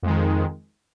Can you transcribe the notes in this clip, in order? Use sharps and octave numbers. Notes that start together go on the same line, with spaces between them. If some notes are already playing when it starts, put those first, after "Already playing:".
F2 D#3 G#3